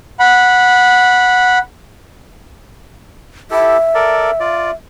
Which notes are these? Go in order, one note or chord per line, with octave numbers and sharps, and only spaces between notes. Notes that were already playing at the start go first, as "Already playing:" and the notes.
F#5 B5
E4 G4 A4 E5
A4 A#4 D5
F4 D5